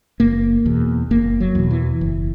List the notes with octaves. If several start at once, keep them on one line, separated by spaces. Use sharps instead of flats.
F#1 A#3
E2 B2
F#1 A#3
F#3
E2 B2
E3
F#1